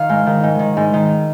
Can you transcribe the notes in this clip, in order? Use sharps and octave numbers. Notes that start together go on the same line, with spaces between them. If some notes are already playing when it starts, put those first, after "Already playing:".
Already playing: D#3 F5
G#2
D#3
G#2
D#3
G#2
D#3